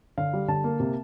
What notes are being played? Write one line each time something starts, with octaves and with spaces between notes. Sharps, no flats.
D3 F5
G3
D3 A5
A#3
C3